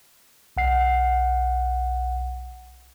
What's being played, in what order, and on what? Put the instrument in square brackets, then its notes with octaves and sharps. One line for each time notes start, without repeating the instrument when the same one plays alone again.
[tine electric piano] B1 F#5 C7